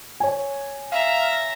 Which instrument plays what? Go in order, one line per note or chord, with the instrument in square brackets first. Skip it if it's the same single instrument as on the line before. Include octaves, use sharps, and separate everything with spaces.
[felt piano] C#5 G#5
[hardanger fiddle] E5 A#5 [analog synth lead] F5